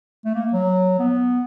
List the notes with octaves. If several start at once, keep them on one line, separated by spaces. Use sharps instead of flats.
A3
A#3
F#3
B3